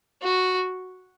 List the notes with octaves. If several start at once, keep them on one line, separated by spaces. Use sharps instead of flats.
F#4